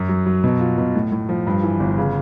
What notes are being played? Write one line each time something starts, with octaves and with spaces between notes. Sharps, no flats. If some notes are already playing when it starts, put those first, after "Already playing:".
Already playing: F#2
F#3
F#3
B2
F4
B2
A2
A2
F3
G2
E3
G1
C#3